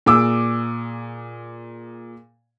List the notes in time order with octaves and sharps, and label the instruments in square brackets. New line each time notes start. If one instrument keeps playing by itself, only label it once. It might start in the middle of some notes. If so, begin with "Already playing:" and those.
[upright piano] A#2 G#4 D6 E6